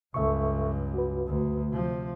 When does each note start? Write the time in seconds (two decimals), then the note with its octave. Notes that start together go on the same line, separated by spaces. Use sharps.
0.14 C#2 G2 A4 E5 C#6
0.94 F#4 B4
1.27 D2
1.69 C3 F3